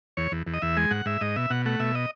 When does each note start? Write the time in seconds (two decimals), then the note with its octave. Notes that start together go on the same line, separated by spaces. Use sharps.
0.17 E2 C#5
0.32 E2
0.47 E2
0.54 D#5
0.62 E2 E5
0.77 G#3 G#5
0.91 G#2 F#5
1.06 G#2 E5
1.21 G#2 D#5
1.36 B2 E5
1.50 B2 F#5
1.66 A3 F#5
1.80 B2 E5
1.95 D#5